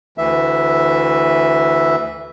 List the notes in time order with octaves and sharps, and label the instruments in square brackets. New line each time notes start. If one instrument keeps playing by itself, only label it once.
[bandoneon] D2 E3 E5